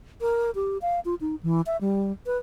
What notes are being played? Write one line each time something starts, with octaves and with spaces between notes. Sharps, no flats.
A#4
G4
F5
F4
D#4
E3
E5
G3
B4